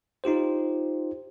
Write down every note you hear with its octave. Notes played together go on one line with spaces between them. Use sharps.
D#4 F4 G4 C5